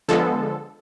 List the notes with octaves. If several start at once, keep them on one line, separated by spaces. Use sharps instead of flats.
D3 F3 G#3 B3 A4